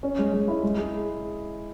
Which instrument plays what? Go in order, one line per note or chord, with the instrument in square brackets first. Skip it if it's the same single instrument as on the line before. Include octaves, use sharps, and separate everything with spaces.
[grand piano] C#4
G#3
G#3
E4
G#3
G#4